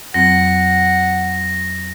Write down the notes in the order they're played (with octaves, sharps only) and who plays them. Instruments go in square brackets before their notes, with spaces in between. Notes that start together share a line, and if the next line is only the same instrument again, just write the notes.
[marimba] F2 F#3 C4 [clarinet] F#5 [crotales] A#6